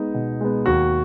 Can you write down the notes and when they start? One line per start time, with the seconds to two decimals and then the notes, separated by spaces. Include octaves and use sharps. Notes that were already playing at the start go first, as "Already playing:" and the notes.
Already playing: G#3 B3 D#4
0.14 B2
0.41 G#3 B3
0.66 D#2 F#4